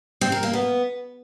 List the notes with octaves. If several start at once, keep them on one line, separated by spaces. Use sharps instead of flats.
C4
A#4
A#3
B3